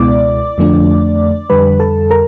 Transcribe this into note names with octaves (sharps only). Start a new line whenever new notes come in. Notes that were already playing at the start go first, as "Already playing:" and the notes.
Already playing: C#2 B2 G#3 B3 E4 D5 D6
F2 D3 F3 A3 D4
F2 D3 G3 B4 B5
A4 A5
A#4 A#5